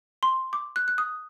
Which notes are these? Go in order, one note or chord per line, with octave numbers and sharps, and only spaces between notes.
C6
D6
F#6
F#6
D#6